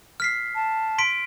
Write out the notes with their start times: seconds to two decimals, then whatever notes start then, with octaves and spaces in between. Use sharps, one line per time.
0.20 F6 B6 C7
0.55 A5
0.98 C6 B6 D7